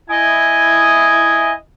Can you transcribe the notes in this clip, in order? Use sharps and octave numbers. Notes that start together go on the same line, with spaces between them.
E4 D#5 G#5